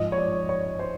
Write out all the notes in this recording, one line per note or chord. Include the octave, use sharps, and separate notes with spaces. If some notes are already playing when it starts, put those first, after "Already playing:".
Already playing: G#2 F3 D#5
C#5
D5
C#5
C5